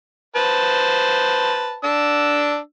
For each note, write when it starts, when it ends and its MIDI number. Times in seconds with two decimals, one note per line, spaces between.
0.36 1.77 71
0.36 1.77 72
0.36 1.77 81
1.84 2.58 62
1.84 2.58 88